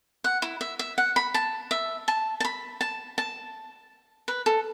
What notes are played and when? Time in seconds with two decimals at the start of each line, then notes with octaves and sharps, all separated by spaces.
0.24 F#5
0.42 E4
0.61 E5
0.79 E5
0.98 F#5
1.16 B5
1.34 A5
1.71 E5
2.08 A5
2.40 A5
2.45 B5
2.81 A5
3.18 A5
4.28 B4
4.46 A4